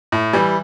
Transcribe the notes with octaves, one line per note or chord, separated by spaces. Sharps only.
A2
E3 G3